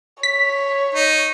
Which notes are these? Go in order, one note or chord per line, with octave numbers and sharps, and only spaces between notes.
C#5 B6
D#4